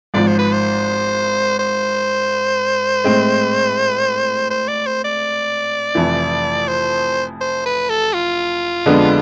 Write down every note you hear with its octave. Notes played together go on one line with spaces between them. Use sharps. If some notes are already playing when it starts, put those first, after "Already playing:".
G#1 G#2 F3 D5
C5
B4
C5
C5
A2 G#3 C4
C5
D5
C5
D5
F1 F2 E3
C5
C5
B4
A4
F4
F2 D3 G#3 B3 D4